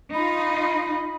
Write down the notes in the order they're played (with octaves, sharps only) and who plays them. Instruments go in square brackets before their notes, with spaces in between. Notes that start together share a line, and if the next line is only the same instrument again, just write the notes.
[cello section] D#4 F4 D#5 [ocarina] B5